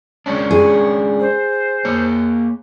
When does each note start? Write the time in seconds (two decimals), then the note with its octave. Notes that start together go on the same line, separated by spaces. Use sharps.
0.26 G#3 C#4 D4 C#5
0.51 G#4
1.20 C5
1.85 A#3 C#5